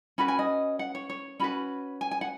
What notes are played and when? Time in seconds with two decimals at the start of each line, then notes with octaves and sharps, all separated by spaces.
0.18 C#4 F#4 B4 B5
0.28 G#5
0.39 D#5
0.79 F#5
0.95 C#5
1.10 C#5
1.40 C#4 F#4 B4 B5
2.01 G#5
2.11 G#5
2.21 F#5